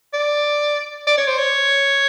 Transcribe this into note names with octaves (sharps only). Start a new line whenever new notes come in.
D5
D5
C#5
C5
C#5